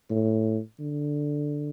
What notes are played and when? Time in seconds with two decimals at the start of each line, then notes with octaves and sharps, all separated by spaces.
0.10 A2
0.80 D3